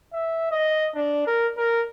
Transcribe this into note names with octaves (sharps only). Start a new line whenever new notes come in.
E5
D#5
D4
A#4
A#4